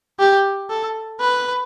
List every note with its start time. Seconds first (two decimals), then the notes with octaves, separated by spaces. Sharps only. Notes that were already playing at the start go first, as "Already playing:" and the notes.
0.19 G4
0.69 A4
1.20 B4